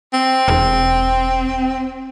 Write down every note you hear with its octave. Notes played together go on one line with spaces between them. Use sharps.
C4
E1